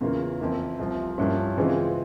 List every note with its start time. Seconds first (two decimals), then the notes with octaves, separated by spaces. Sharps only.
0.01 E2 C#3 E3 A#3 F4
0.40 F2 E3 A#3 E4
0.79 C2 C3 F3
1.18 G2 F3 A#3 C#4 E4
1.57 C#3 E3 G#3 C4 F4